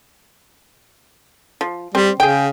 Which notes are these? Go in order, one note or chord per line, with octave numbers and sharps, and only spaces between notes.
F3
G3 C4
C#3 G#4 G5